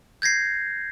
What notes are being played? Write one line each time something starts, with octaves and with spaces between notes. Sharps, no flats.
G6 G#6 A#6 C7